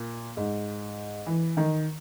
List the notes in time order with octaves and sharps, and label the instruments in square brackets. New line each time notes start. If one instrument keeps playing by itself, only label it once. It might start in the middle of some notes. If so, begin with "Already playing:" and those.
Already playing: [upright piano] A#2
G#2
E3
D#3